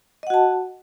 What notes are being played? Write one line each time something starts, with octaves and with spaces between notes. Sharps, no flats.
F#4 D#5 F#5 A5